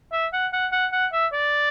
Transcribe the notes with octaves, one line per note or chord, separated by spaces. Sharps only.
E5
F#5
F#5
F#5
F#5
E5
D5